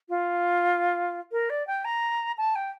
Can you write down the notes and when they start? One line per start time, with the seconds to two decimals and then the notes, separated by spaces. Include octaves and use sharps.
0.09 F4
1.32 A#4
1.50 D5
1.67 G5
1.85 A#5
2.37 A5
2.55 G5